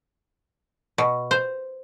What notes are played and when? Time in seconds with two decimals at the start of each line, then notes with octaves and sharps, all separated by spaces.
0.98 B2
1.31 C5